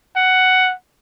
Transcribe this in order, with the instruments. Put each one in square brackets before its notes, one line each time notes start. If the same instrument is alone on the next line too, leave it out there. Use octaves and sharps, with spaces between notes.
[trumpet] F#5